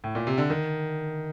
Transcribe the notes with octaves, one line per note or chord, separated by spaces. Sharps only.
A2
A#2
C3
D3
D#3